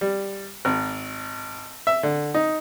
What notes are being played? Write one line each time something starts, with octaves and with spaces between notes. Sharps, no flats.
G3
G#1
E5
D3
D#4